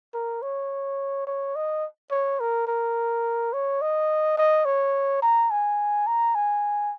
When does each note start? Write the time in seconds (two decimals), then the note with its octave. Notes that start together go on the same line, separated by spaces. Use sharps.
0.14 A#4
0.42 C#5
1.27 C#5
1.56 D#5
2.11 C#5
2.40 A#4
2.67 A#4
3.53 C#5
3.81 D#5
4.38 D#5
4.65 C#5
5.22 A#5
5.51 G#5
6.07 A#5
6.35 G#5